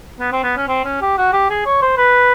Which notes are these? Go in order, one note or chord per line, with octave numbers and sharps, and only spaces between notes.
B3
C4
B3
C#4
C4
C#4
G4
F#4
G4
G#4
C#5
C5
B4